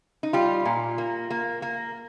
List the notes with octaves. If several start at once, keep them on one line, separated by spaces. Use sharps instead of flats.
D#4
G3 F4
A#2
A#3
A#3
A#3